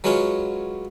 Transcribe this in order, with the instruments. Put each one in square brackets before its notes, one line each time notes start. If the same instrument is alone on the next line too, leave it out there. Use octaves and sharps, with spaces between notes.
[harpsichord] F#3 G#3 B3 C#4 F4